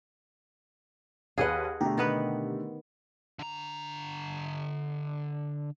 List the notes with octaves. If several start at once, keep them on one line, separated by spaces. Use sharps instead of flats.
D#2 G#4 B4 D#5 F#5
B2 D3 A3 G4 A#5
D#3 B3 B4
D3 A#5